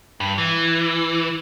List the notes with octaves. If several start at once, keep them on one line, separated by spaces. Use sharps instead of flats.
G2
E3